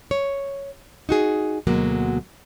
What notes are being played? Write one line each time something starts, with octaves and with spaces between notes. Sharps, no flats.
C#5
D#4 F#4 G#4
D2 B2 F#3 G#3 A#3